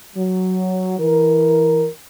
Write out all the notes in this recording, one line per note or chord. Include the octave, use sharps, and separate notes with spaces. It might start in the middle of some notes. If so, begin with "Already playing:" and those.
F#3
E3 A#4